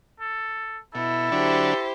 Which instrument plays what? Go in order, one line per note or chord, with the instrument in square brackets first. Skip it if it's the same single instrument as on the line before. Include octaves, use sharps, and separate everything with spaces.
[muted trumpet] A4
[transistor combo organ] B2 [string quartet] E4 [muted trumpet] A4
[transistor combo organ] D3 F#3 D4 [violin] G4 C5